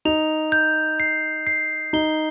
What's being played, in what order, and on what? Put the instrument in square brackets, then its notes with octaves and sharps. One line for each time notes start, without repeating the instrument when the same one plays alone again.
[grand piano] D#4 [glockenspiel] F7
[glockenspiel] G6
C7
C7
[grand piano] D#4 [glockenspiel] G7